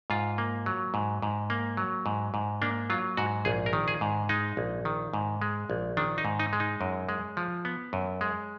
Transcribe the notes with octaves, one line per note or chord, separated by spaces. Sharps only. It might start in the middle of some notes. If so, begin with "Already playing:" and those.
G#2 F4
A#3
F#3
G#2
G#2
A#3
F#3
G#2
G#2
A#3 D4
F#3 F4
G#2 F#4
A#1 G#4
A#4
D#3
G#4
G#2
G#3 D#4
A#1
D#3
G#2
G#3
A#1
D#3 D4
D#4
G#2
D#4
G#3
D#4
F#2
G#3
F3
B3
F#2
G#3